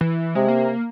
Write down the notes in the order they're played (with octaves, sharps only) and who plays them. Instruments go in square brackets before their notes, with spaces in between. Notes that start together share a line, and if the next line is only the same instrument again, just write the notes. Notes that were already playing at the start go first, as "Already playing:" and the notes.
[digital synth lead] E3
[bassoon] C3 [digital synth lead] G#3
[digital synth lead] A#3